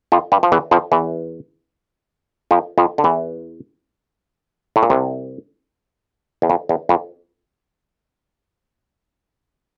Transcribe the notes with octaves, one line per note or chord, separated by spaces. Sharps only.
F2 F3
G2 G3
F3
E2 E3
F2 F3
E2 E3
F2 F3
F2 F3
D3
E2 E3
A2
A#2
C2 C3
E2
F2
E2
F2